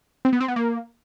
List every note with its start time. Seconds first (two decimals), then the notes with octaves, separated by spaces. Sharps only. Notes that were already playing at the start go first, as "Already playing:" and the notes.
0.25 C4
0.33 B3
0.40 C4
0.48 B3
0.56 A#3